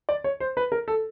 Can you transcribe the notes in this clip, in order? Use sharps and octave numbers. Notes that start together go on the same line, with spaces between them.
D5
C#5
C5
B4
A#4
A4